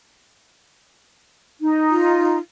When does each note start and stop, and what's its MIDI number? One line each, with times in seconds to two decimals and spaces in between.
1.61 2.38 63
1.90 2.37 65